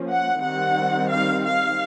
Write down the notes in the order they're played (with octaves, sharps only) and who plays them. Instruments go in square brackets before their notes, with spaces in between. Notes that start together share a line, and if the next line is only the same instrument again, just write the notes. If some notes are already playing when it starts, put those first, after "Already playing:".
Already playing: [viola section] F3 A#3 C#4
F#5
D#3 G3 C4 F#5
F5
F5